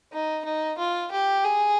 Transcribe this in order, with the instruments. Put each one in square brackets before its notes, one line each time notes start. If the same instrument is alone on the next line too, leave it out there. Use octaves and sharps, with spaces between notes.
[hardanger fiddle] D#4
D#4
F4
G4
G#4